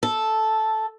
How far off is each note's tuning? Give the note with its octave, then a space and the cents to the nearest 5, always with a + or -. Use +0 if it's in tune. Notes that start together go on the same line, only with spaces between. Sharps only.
A4 -5